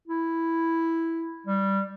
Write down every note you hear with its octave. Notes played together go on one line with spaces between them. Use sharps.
E4
G3